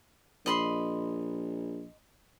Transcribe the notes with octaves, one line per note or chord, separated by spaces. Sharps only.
A#1 D#5 B5 C6